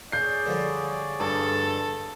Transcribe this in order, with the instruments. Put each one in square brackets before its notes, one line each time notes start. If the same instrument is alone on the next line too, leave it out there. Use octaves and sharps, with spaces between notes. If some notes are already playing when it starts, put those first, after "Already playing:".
[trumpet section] G#4 C#5 D5 [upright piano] G6 C7
[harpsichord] D3 F3 G3
[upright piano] G2 [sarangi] A4